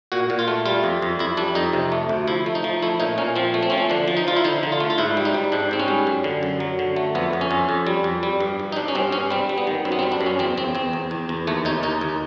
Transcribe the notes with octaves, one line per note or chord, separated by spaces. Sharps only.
A#2 F#4
A#2
F4
A3
G3 F4
F2
F2
F2 E4
G3 D4
F2 D#4
C3
A3
D2
F3 E4
A3
D#4
F3
A3 E4
A#2 D#4
A#2 C#4
F3 C4
A3
C4
F3 C#4
C4
D3 D4
F3
D#4
F3 F4
E4
D3 D#4
D3
F4
A3
F4
G#2 E4
G3
D#4
G3
G#2 D4
G#2 C4
C#4
G3
F#2
D3
F#2
F#3
D3
A3
F2 B3
F2
C#4
F2
F2
G3
F2
G3
G2
G2
D#4
G2 D4
C#4
G2 C4
G2 C#4
G3 C4
G3
B3
D#3
F#2 C4
B3
C4
G3
D4
F#2
C#4
E2 C4
E2 C4
E2 C4
E2
E2
E2
D#2 A3
D#2 D#4
D#2 D#4
D#2